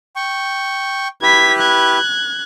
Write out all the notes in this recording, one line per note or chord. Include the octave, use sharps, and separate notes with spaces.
G5 C#6
E4 G4 B4 G#6 B6
F#6 G#6